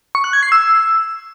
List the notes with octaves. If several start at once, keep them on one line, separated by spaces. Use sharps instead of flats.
C#6
F#6
G#6
C7
E6